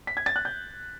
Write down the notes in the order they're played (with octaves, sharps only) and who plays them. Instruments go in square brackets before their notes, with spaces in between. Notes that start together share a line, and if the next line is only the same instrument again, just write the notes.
[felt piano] B6
G#6
A6
F#6
G6